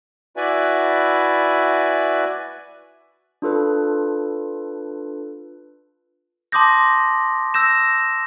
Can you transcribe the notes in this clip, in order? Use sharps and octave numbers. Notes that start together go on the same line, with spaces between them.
E4 F#4 B4 D5 E5 G#5
D4 F4 A4 B4
A5 C6 D6 D#6 G6 A#6
E6 G6 A#6 E7